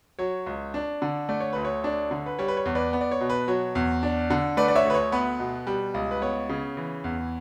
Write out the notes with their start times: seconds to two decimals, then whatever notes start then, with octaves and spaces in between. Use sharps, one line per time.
0.19 F#3 C#5
0.46 C#2
0.74 D4
1.02 D3
1.29 A3 D5
1.40 C#5
1.53 D2 B4
1.65 C#5
1.84 D4
2.11 D3
2.26 B4
2.39 G3 C#5
2.48 B4
2.57 C#5
2.65 E2
2.75 B4 D5
2.93 B3
3.01 D5
3.11 C#5
3.20 B2
3.30 B4
3.48 F#3 C#5
3.75 E2
4.03 D4
4.30 D3
4.57 A3 B4 D5
4.68 D5
4.76 C#5 E5
4.85 D2 B4
4.94 C#5
5.12 B3 B4
5.39 B2
5.67 G3
5.94 C#2
6.11 B4
6.22 B3 C#5
6.49 C#3
6.77 E3
7.04 E2